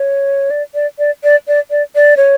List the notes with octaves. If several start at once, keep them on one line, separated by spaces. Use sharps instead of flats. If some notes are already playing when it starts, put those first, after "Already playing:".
Already playing: C#5
D5
D5
D5
D5
D5
D5
D5
C#5